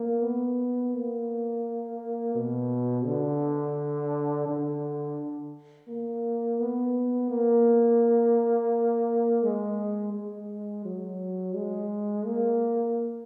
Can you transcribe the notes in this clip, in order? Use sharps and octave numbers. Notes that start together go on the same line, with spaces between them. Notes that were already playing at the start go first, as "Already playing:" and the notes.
Already playing: A#3
B3
A#3
B2
D3
D3
A#3
B3
A#3
G#3
G#3
F#3
G#3
A#3